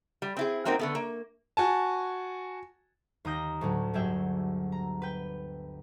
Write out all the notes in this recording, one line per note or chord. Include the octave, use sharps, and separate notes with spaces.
G3
C4 E4 G#4
F#3 A#3 C4 D#4 A#4
D3 A3 B3
A#3
F#4 G#5 A5
D#2 A#5 D#6 G6 A#6
D2 A2 F#3
G1 F#3 G4 G#4 E5 G5
A#5
B4 G5